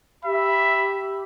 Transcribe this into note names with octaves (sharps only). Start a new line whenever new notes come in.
G4 E5 B5